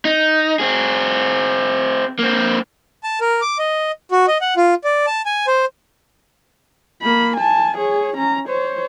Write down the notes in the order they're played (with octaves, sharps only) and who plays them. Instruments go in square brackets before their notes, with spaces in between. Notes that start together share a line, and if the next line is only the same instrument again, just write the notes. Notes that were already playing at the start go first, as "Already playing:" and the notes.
[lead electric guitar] D#4
C4 G#4
A#3 C4
[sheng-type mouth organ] A5
A#4
D6
D#5
F#4
D#5
F#5
F4
D5
A5
G#5
C5
[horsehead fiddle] A#3 B5
G#5 A5
G#4 C#5
C#4 A#5
C5 C#5